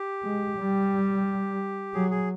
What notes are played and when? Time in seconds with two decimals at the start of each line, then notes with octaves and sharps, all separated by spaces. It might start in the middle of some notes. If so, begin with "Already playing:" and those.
Already playing: G4
0.23 G#3
0.57 G3
1.94 F#3 G#4
2.11 G#4